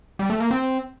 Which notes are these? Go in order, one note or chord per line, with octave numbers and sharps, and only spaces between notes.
G3
A3
A#3
C4